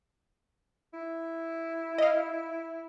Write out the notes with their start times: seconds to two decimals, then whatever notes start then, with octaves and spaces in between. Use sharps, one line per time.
0.94 E4
1.98 D#5 F5